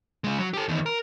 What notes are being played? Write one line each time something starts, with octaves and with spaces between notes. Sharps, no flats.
C#3 G#3
F#3
G4 A4
E2 D#3
A#4